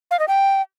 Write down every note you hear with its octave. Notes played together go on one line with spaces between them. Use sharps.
F5
D#5
G5